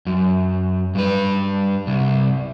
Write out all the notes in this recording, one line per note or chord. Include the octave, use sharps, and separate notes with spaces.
F#2
G2 B4
C2